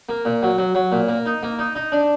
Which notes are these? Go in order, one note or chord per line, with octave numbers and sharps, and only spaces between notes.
A#3
A#2
F#3
F#3
F#3
A#2
A#3
D#4
A#3
D#4
D#4
D4